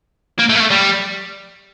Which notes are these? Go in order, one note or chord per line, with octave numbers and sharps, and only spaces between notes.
A#3
A3
A#3
A3
G3